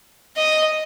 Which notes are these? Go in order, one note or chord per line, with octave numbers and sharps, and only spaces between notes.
D#5